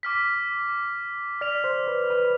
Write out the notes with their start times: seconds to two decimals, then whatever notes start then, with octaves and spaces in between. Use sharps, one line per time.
0.03 D6 F6 B6
1.41 D5 F6 B6 F7
1.64 C5
1.88 B4
2.10 B4